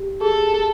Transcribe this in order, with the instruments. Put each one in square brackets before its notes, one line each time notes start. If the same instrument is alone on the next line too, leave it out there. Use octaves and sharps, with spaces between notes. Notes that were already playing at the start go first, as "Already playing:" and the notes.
Already playing: [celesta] G4
[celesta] G#4 [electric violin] A4